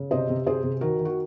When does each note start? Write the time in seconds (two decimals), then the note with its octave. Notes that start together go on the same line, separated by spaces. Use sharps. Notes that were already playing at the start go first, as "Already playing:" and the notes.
Already playing: C#3
0.11 C3 C5 D#5
0.29 C3
0.46 C3 G#4 C5
0.63 C3
0.81 D#3 F#4 A#4
0.99 D#3
1.05 F#4